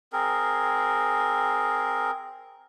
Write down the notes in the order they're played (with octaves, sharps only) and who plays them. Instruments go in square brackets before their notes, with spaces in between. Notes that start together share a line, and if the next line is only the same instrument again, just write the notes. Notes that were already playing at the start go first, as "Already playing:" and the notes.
[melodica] C4 G#4 A#4